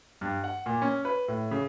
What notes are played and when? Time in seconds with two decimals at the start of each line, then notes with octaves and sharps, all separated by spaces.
0.21 G2
0.44 F#5
0.66 A#2
0.82 C#4
1.05 B4
1.28 A2
1.51 C#3